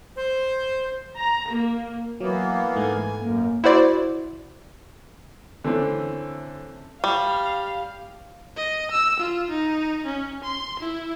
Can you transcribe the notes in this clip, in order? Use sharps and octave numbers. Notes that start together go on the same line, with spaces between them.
C5
A#5
A#3
E3 F#3 A#3 B3
G#2 A3 G#5
F#2 A#3
E4 F#4 C5 D5
D3 E3 A3 C4 C#4
G3 F5
D#5
E6
F4
D#4
C#4
C6
E4